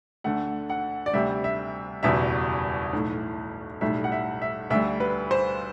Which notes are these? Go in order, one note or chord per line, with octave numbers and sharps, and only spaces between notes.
D2 D3 A3 F#5
F#5
D5
D2 C3 G3 E5
E5
F#1 E2 B2 G3 E5
B1 A2 E3
B1 A2 G3 E5
F#5
E5
E5
D2 D3 G3 E5
B4
C5